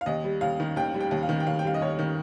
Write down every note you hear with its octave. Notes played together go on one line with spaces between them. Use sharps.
F5
D#2 D#5
G3
D#2 F5
D#3
D#2 G5
G3
G5
D#2
F5
D#3
G5
D#2 F5
G5
G3 F5
D#5
D#2 C#5
D#3